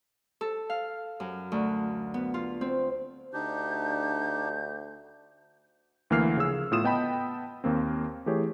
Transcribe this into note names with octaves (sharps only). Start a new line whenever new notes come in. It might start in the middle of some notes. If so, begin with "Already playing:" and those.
A4
F5
F#2
D2
B3
F4
C4
D2 D4 D#4 G4 G6
D2 E3 A#3 F6 C7
C#3 F3 C#4 G#4 E6
A2 B3 F4 D#6 D#7 E7
B3 D#5 G5 A5 B5
D#2 A#3 C4
E3 A3 G4 G#4 C#5